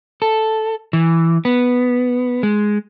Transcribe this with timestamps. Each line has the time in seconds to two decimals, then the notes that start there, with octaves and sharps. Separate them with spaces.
0.22 A4
0.93 E3
1.45 B3
2.43 G#3